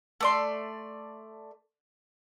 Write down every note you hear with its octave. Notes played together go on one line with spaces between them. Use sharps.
A3 D5 C6